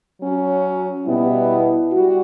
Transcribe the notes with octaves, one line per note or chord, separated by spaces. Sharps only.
F#3 C#4 F#4
B2 G3 B3 E4
G3 F#4